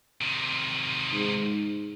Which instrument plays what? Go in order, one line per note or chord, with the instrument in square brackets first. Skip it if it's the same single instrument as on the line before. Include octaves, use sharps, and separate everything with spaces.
[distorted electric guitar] C3 D#3
[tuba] G#2